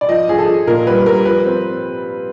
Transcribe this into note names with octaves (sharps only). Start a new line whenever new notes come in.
D5
F3 D#5
F3 G#4
A4
F3
A#2 A#4
G3 B4
G3 A#4
F3 B4
C4